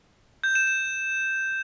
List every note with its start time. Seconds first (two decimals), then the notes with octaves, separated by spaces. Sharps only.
0.44 G6
0.55 E7
0.67 E7